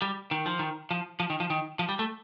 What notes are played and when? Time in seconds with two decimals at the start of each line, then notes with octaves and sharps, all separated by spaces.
0.02 G3
0.31 D#3
0.46 F3
0.59 D#3
0.91 F3
1.20 F3
1.30 D#3
1.40 F3
1.50 D#3
1.79 F3
1.89 G3
1.99 A3